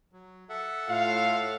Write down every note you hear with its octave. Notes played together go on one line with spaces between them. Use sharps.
F#3
A4 E5 F#5
A2 F4 F5